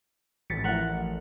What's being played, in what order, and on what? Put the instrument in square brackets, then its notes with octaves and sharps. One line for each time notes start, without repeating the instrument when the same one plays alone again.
[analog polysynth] A1 [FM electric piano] A6 B6 C#7
[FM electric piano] F3 E4 [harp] A#4 F#5